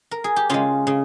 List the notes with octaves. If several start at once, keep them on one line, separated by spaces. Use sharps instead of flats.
A#4
G#4
G4
C#3 G#3 C#4 F4
C#3